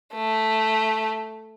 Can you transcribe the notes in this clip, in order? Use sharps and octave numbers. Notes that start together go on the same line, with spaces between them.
A3